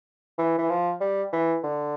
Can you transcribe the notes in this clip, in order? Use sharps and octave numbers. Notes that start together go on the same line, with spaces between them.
E3
E3
F3
G3
E3
D3